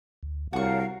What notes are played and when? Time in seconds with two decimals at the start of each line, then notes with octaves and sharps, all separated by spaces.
0.23 D2
0.53 C2 F#4 A#4 C#5 F5 G5 A5 C#6